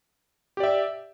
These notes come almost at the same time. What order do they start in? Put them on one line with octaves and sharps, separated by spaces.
G4 D5 E5